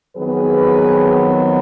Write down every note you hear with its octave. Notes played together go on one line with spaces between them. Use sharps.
F2 D#3 F#3 B3 G#4 B4